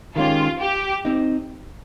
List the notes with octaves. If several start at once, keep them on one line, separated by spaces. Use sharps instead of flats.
D#3 G#3 C#4 F4 G4
G4
C4 D#4